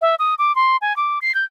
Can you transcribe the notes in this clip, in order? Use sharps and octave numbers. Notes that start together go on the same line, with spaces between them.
E5
D#6
D6
C6
G#5
D6
C7
G6